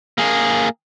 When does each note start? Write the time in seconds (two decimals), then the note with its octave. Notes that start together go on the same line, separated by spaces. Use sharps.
0.18 A#3 G#4